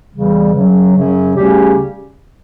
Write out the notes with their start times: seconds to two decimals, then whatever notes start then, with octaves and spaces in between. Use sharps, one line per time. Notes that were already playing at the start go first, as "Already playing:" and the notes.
0.12 E2 C#3 E3 G3
0.53 F#2 C#3 F#3
0.94 F#2 C#3 F#3
1.35 D2 C#3 G3 C#4 G4